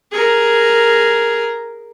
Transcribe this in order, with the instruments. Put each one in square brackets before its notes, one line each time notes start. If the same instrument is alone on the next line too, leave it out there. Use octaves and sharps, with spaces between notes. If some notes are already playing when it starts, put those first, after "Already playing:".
[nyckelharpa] G#4 A#4